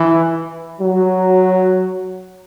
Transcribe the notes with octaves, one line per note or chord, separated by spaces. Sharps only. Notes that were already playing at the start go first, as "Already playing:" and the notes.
Already playing: E3
F#3